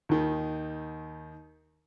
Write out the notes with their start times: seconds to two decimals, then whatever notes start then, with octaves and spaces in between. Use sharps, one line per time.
0.09 D#2 D#3